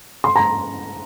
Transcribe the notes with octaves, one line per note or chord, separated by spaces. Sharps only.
C6
A#5